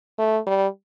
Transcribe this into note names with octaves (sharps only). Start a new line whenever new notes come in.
A3
G3